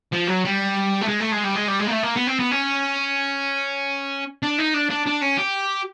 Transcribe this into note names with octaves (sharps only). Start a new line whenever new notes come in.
F3
F#3
G3
A3
G#3
A3
G#3
G3
G#3
G3
G#3
A#3
A3
A#3
B3
C4
B3
C#4
D4
D#4
D4
D4
D4
C#4
G4